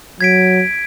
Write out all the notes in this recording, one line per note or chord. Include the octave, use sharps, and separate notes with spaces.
F#3 G#6 B6 D7